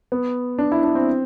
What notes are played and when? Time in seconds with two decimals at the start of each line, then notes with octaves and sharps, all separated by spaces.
0.12 B3
0.59 D4
0.72 E4
0.83 D4
0.95 C4